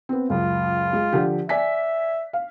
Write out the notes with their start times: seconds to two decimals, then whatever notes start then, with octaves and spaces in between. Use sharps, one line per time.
0.09 B3 C4
0.30 C#2 F#2 F4
0.93 G#3
1.12 D3 F3 G4
1.49 D5 E5 G#5 B6
2.33 F5